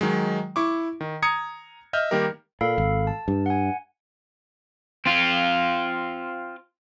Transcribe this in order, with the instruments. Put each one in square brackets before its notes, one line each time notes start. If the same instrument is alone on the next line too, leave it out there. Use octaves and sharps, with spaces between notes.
[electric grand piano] D#3 F#3 G#3
E4 C#6 D6
D#3
A#5 D#6 G#6 C#7
D#5 E5 F6 G6
D#3 G3 A#3 G4 A#4
[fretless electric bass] A#2 [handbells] A4 F5 B5
[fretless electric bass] G#1
[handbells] A5
[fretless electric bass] G2
[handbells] F#5 G#5
[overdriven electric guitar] C4 F4